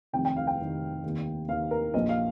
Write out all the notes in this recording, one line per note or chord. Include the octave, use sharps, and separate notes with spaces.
F1 F2 C3 D#3 G5
G5
F5
G5
F1 F2 C3 D#3
D#2 D#3
D#2 D#3 F5
A#4
A#1 A#2 D#5
F5